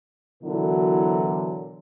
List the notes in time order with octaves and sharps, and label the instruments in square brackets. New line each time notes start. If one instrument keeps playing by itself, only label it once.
[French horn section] B2 D3 E3 F#3 E4 A#4